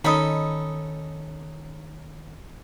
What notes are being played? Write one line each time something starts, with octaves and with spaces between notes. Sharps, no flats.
D#3 C#4 D#4 A4 D#5 B5